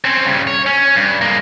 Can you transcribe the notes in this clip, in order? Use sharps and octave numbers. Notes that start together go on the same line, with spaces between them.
C4 C#4
G2 C#3
C#5
C#4
G2
G#3 A#3